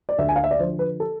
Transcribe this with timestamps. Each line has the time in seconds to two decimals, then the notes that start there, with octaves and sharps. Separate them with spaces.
0.09 D5
0.18 D2 E5
0.29 G#5
0.36 F5
0.44 E5
0.51 D5
0.59 D3 F3 C5
0.79 B4
1.00 A4